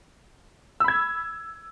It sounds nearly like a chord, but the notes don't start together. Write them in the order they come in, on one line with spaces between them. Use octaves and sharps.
E6 B5 G#6